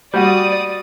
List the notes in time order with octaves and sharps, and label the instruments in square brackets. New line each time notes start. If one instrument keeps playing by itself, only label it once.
[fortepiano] G3 F#4 [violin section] D5 D#6